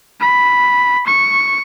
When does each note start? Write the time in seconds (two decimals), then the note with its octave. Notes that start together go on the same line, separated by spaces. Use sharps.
0.21 B5
1.07 C#6